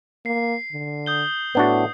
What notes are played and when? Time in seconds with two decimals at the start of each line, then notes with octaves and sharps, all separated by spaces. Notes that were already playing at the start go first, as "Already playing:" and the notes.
0.26 A#3 C7
0.72 D3
1.06 D#6 G6 G7
1.55 A2 B3 D4 F#4